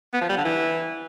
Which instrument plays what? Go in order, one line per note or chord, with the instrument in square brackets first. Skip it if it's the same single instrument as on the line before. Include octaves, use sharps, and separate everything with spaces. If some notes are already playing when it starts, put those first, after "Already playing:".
[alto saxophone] B3
F3
G3
D3
E3